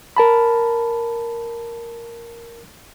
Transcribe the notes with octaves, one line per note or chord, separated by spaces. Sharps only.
A#4 A5 B5